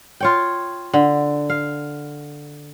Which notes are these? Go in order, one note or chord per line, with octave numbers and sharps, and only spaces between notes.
F4 C#5 G5
D3
F5